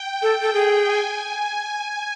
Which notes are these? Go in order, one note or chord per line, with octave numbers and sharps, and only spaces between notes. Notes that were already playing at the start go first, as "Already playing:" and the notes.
Already playing: G5
A4
A4
G#4
G#5